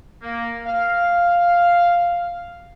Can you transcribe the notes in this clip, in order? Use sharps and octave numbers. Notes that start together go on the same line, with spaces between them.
A#3
F5